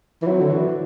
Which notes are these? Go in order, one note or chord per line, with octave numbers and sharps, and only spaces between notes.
E3
F#3 C4 E4
D3
E3 D4 F#4